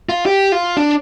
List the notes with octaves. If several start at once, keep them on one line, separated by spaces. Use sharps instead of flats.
F4
G4
F4
D4